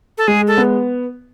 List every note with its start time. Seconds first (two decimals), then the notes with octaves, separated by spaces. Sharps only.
0.18 A4
0.28 G#3 G#4
0.47 A4
0.57 B3